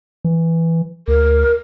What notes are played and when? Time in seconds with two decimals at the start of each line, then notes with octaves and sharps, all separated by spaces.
0.24 E3
1.08 D2 A#4